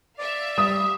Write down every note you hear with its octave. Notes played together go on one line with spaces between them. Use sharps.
D5 E5 F5
G3 D#6